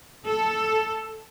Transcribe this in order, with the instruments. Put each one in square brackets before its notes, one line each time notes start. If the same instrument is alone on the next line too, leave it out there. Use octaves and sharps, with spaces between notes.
[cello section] A4